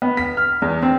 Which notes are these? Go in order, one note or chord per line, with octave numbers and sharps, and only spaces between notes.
B3
B6
F6
E2
C4